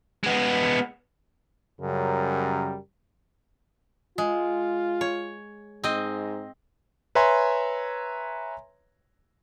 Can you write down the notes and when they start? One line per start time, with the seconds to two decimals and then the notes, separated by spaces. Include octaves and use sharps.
0.24 G#3 B3
1.81 F#2 C#3 G3 A#4
4.18 G#3 F4
5.01 C#5
5.84 G#2 C4 D#5
7.15 B4 C#5 E5 G#5 A#5 C6